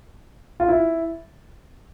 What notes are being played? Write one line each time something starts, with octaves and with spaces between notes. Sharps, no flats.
F4
E4